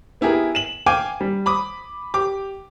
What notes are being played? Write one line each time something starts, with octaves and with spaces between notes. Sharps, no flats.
B3 E4 G4 G#4 A#4
E7 F#7
F5 G5 G#5 D6
G3
B5 D6 D#6
G4 D6